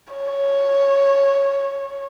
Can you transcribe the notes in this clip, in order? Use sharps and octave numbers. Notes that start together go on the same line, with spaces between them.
C#5